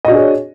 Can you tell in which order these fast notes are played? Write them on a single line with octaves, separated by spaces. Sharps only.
D#5 F#4 D4 G#4 C#5